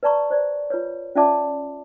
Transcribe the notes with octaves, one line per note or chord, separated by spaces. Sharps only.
B4 D5 A5 A#5 C#6
C5 D5
F4 B4 C#5
C#4 F4 D5 E5 A5 D6